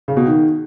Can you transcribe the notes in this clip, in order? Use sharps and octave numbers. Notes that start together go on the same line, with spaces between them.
C#3
B2
D#3